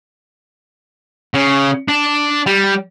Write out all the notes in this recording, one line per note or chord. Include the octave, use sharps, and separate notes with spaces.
C#3
D4
G3